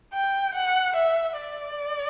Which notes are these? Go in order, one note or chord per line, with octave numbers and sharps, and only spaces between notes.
G5
F#5
E5
D5